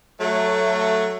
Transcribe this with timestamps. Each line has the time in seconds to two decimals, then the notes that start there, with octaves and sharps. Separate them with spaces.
0.19 F#3 A3